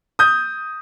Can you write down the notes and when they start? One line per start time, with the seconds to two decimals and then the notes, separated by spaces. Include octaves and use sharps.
0.19 D#6 G6